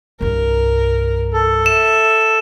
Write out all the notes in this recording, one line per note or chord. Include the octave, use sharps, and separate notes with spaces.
C2 G2 A#4
A4
E5 E7